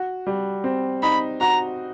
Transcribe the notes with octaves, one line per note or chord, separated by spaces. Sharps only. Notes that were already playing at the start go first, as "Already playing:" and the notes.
Already playing: F#4
G3
C4
D#4 B5
F#4 A#5